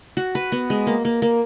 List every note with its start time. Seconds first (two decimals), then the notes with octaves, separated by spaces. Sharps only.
0.17 F#4
0.35 B4
0.52 B3
0.70 G#3
0.87 A#3
1.05 A#3
1.22 A#3